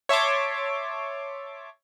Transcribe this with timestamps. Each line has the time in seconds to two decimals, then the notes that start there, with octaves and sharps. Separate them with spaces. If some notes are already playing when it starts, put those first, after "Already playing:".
0.09 C#5 E5 A5 C6 D6